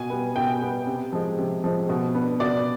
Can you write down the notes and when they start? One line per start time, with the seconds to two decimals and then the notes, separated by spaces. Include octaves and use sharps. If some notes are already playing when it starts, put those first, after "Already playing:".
Already playing: B2 G#5
0.10 G3 B3
0.36 B2 G5
0.61 G3 B3
0.87 C3
1.13 F3 G#3
1.38 C3
1.64 F3 G#3
1.89 B2
2.15 B3 D4
2.40 B2 D5